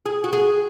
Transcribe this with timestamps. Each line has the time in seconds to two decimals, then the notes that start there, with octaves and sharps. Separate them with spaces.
0.06 G#4
0.24 F#4
0.33 G#4